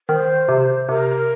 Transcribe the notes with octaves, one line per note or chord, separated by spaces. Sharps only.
D#3 C5
C3
C3 A#4